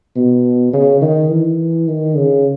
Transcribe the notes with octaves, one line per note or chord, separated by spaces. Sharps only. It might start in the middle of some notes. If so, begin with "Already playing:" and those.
B2
C#3
D#3
E3
D#3
C#3